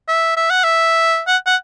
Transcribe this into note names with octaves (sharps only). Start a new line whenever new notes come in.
E5
E5
F#5
E5
F#5
F#5